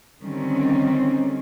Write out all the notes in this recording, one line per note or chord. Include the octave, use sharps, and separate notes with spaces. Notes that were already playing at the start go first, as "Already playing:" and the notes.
D3 D#3 G3 C4 C#4